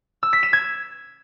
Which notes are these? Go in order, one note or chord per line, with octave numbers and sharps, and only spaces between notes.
E6
B6
E7
G#6